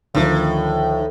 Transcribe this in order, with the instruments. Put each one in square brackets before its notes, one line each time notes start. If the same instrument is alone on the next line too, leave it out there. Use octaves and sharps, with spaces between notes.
[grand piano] D2 D#3 F3 [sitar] A2